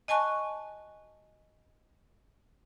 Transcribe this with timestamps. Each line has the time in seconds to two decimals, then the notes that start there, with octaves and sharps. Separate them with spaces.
0.08 D#5 G#5 A5 C#6 F#6